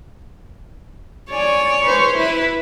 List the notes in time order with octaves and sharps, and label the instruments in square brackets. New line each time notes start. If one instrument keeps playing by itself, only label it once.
[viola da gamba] C#5 [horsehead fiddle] D5 G#5
[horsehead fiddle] B4 C5
[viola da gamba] E4 [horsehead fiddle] B4